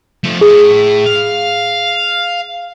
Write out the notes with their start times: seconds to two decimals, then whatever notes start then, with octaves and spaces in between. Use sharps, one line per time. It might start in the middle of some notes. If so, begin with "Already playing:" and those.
0.24 F3 A3
0.41 A2 G#4
1.06 F5